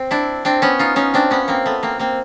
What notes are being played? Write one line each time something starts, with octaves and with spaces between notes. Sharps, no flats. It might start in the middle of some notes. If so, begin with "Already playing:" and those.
Already playing: C4
D4 E4
C4 D4
B3 C#4
D#4 F4
C#4 D#4
C4 D4
B3 C#4
A#3 C4
A3 B3
A#3 C4
A#3 C4